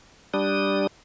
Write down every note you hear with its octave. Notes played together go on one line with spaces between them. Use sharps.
G3 D4 D#6